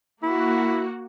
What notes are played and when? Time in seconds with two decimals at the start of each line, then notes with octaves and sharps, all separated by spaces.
0.23 A#3 E4 F#4